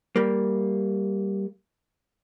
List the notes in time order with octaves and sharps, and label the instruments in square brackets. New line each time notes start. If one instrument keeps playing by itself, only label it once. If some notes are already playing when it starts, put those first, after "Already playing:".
[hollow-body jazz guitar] G3 A#3